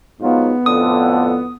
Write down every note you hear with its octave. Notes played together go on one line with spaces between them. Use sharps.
G#2 F#3 B3 F4
F2 A2 D3 D#6